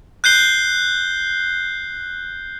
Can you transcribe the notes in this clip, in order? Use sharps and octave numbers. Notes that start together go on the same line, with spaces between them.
F#6 G6 C7 G7